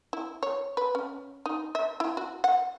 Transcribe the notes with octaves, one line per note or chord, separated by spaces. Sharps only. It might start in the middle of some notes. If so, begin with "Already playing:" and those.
E4
C#5
B4
C#4
D#4
E5
E4
F#4
F#5